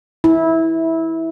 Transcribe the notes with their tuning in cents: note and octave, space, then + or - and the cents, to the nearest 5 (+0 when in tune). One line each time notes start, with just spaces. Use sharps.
E4 -15